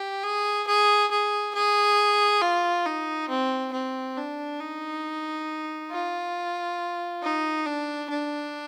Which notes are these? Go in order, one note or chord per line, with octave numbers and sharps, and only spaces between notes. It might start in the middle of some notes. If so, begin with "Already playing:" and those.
Already playing: G4
G#4
G#4
G#4
G#4
F4
D#4
C4
C4
D4
D#4
F4
D#4
D4
D4